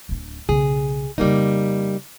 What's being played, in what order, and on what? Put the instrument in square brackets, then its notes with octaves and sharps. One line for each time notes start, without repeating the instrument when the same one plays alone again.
[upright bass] D1 D4
[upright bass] B1 C#3 [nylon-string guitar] G#4
[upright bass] F2 C#3 [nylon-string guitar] G3 A#3 D#4